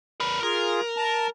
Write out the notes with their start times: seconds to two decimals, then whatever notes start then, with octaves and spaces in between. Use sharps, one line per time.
0.20 A#4 B4
0.43 F4 G#4 A#4
0.97 A5 A#5